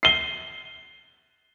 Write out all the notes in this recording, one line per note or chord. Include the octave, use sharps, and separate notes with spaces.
C7 G7